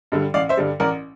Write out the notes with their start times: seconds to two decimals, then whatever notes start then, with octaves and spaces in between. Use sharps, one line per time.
0.12 G2 D3 G3
0.34 A1 D5 F5
0.49 C5 E5
0.57 G2 D3 G3
0.80 A1 A#4 D5